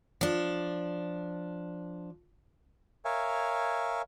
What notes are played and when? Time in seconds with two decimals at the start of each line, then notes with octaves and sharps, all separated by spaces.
0.21 F3 D4
3.05 A#4 C#5 E5 F5 G#5